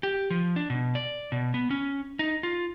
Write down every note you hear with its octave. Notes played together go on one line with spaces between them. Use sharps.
G4
F3
D4
B2
D5
B2
B3
C#4
D#4
F4